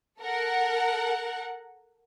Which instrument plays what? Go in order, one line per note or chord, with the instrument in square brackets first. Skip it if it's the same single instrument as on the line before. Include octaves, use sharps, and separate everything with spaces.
[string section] A4 A#4 F#5